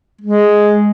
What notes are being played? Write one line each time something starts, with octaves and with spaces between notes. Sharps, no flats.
G#3